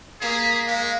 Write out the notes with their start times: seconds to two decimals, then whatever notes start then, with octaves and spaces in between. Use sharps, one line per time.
0.21 A#3 G#4 B6
0.67 G#3 F5